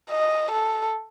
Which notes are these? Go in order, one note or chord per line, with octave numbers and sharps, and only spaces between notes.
D#5
A4